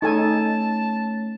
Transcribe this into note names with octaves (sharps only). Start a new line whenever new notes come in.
A3 C#4 D#4 A4 C#5 G#5 A5